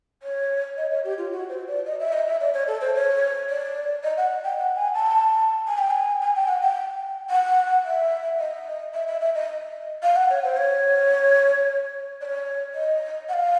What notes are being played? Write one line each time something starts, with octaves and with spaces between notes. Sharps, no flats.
C#5
D#5
C#5
G4
F4
F#4
C5
D5
D#5
E5
D#5
E5
D5
C#5
A4
C5
C#5
D5
D#5
F#5
G5
F#5
G#5
A5
G#5
G5
G#5
G#5
G5
F#5
G5
F#5
E5
D#5
E5
E5
E5
D#5
F5
F#5
C#5
C5
C#5
D5
C#5
D#5
F#5
F5